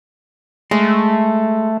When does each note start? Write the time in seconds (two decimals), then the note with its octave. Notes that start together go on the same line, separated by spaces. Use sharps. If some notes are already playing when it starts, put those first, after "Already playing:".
0.71 G#3 A3